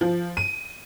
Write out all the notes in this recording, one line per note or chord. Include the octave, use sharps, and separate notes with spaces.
F3
D#7